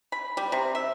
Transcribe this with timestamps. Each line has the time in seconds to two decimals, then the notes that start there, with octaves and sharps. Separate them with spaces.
0.12 B5
0.37 G3
0.52 C3
0.75 E5